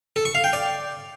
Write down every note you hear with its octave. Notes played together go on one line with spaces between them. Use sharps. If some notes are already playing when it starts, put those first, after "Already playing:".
A4
C#6
F5
G5
D5